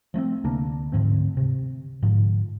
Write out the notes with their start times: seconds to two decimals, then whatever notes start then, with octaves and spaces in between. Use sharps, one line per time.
0.14 F3 A3 B3 C4
0.44 D2 C3 A#3 D4
0.92 D2 G#2 F3 C4
1.37 C3
2.03 G#2 D3 F3